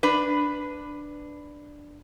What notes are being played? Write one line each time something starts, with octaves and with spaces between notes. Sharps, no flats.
D4 B4